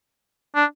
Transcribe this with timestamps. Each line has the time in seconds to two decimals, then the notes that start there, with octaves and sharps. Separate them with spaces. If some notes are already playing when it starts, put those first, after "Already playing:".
0.56 D4